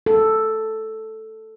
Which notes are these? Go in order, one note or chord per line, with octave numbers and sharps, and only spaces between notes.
A4